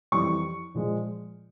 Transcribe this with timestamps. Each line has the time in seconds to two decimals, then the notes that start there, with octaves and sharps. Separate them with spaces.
0.12 F2 E3 G3 C#6
0.74 A#2 F3 G#3